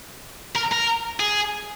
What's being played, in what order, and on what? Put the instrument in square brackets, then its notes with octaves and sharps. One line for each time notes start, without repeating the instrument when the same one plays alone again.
[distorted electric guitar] A#4
A#4
G#4